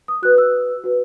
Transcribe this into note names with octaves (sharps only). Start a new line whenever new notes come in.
D#6
F#4 B4 F#6
E6
F#4 B4